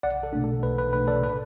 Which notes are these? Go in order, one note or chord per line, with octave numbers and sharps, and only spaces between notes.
B1 D5 F#5
A4
B2 A3 D4
A4
B1 B4
B4
B2 A3 D4 B4
A4 D5
A2 B4